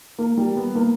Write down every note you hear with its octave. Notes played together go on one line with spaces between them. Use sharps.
A#3
G3
B3
A#3